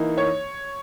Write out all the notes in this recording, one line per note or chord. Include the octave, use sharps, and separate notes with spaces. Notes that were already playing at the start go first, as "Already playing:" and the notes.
Already playing: E3 A#3 D#4
C#5